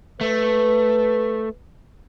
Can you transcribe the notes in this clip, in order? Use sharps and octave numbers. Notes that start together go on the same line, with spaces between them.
A3 B4